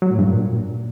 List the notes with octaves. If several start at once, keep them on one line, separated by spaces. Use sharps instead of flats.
F#3
A2
G2
A#2